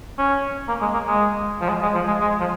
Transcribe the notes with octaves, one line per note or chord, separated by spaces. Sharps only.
C#4
A#3
G#3
A#3
G#3
F3
G#3
G#3
F3
G#3
G#3
F3